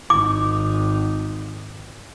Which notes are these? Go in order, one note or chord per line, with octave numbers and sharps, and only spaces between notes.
G#1 D#4 D6